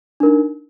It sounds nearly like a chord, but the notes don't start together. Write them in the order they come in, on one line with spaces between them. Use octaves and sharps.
D4 A#4 D#4